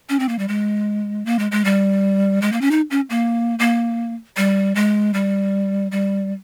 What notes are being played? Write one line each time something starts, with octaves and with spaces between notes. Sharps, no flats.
C#4
C4
A#3
G3
G#3
A#3
G#3
G#3
G3
G#3
A#3
C#4
D#4
C#4
A#3
A#3
G3
G#3
G3
G3